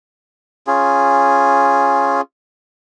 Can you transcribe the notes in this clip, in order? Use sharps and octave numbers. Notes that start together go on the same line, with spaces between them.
C#4 F4 G#4